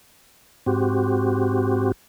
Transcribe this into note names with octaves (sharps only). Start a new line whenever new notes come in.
G#2 C4 F#4 G4